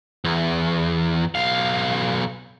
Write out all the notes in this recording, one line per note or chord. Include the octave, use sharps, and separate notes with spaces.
E2
B1 F5